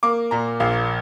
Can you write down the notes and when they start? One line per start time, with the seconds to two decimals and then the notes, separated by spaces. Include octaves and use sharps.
0.03 A#3 D6
0.31 A#2 A#5
0.60 A#1 F5